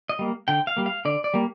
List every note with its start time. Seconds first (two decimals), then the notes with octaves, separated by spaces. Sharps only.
0.09 D#5
0.19 G3 A#3
0.48 D3 G5
0.67 F5
0.77 G3 A#3
0.86 F5
1.05 D3 D5
1.24 D5
1.34 G3 A#3